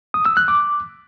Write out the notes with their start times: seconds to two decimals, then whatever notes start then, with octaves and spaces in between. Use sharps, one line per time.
0.14 D#6
0.25 E6
0.37 F#6
0.48 D6